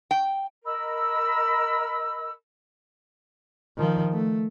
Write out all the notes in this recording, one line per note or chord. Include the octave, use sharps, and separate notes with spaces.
G5
A#4 D#5 B5 E6
D#3 F3
A3